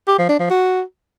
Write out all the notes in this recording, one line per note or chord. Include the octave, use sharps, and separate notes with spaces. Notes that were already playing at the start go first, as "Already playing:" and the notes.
G4
F3
D4
F3
F#4